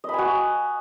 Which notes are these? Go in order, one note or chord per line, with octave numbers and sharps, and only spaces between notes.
F#4 D#5 G#5 B5